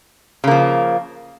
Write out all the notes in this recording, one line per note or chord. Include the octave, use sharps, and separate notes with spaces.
C#3 F3 A#3